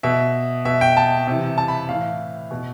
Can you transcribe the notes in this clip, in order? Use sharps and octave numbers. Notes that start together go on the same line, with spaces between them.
B2 E5
B2 E5
G5
A5
C3 E3
A5
B5
A2 E3 F5
B2